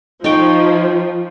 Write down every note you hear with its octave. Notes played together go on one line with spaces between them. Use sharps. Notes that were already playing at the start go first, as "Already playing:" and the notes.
F3 D#4 C#5 G5